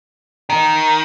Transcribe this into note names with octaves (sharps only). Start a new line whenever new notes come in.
D#3